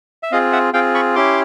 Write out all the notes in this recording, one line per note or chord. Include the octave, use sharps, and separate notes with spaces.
E5
C4 F4 G#4 D#5 F5
E5 F#5
C4 F4 G#4 F5 G5
B5 C#6
C#4 E4 G4 C6 D6